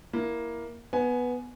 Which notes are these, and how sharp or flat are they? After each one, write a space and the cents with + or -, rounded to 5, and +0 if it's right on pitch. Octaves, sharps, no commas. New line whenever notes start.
A#3 +10 E4 +5
B3 +0 G#5 +15